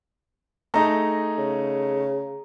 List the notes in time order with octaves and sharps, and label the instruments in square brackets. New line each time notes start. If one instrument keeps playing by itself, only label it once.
[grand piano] A3 D#4 G#4 [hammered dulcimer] A#5
[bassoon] C#3